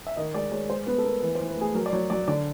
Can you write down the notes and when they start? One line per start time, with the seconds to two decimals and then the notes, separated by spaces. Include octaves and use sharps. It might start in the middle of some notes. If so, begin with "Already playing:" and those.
0.07 E5
0.17 D#3 D#5
0.34 G#3 D5
0.51 G#3 C#5
0.69 G#3 C5
0.86 B3 B4
0.98 A4
1.05 B3 A#4
1.22 E3 B4
1.35 C5
1.40 E3
1.48 B4
1.57 A3 G#4
1.75 F#3 A#4
1.86 D5
1.93 F#3 C#5
2.10 F#3 D5
2.28 D3 D5